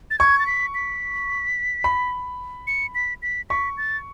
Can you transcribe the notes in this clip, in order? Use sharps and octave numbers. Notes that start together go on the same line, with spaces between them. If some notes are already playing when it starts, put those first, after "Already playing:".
A6
C#6 G#6
A6
B6
B6
B5
C#7
B6
B6
C#6 B6
A6